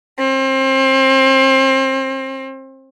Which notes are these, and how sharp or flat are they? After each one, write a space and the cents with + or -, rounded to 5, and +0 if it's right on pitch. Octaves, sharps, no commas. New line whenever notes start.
C4 +30